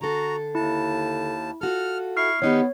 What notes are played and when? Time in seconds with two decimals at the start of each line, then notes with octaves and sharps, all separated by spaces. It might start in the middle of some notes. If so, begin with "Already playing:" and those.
0.01 D3 F#4 A4 A#5
0.55 D#2 E4 A5
1.61 F4 F#4 A4 F6
2.17 E4 C#6 F6 C7
2.42 D#3 B3 D#4 G4 C#5 F#5